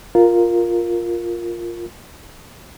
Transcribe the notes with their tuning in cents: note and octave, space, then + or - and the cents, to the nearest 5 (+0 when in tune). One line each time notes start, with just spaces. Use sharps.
F4 +0 A#4 +0